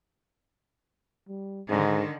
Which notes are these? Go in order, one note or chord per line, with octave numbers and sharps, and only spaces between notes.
G3
G#2 D3 D#3